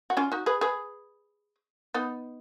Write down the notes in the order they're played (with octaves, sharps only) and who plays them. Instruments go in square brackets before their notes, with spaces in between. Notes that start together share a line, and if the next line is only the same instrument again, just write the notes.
[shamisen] F#4
C#4 F4
D#4 F#4
G#4 B4
G#4 B4
B3 D#4